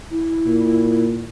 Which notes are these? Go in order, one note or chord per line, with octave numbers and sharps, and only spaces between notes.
E4
A#2